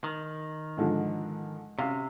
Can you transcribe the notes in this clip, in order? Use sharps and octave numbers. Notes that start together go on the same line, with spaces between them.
D#3
G#2 D3 F3
C3 C#4 F5